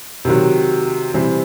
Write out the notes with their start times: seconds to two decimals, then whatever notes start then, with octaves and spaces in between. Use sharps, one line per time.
0.25 C3 D#3 F#3
1.14 C3 E3 G3 C4